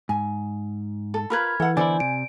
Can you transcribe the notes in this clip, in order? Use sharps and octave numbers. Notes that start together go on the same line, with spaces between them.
G#2 G#5
A4
F4 A#4 B4 B5 F6 G#6
E3 A4 F#5
D3 B3 E4 C5 D5 G#5
C3 D7